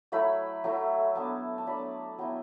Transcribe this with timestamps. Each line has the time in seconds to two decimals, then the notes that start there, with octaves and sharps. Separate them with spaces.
0.12 F#3 A3 E4 B5
0.64 F#3 A3 E4
1.15 F#3 B3 D4 A5
1.58 A5
1.67 F#3 B3 D4 B5
2.18 F#3 B3 E4 G5